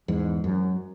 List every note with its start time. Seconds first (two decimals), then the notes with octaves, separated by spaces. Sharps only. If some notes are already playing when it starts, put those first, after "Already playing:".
0.08 E2 G#2
0.44 F#2